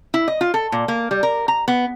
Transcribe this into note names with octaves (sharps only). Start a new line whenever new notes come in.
E4
D#5
F4
A4
A#2
A#3
G3
A#4
A#5
B3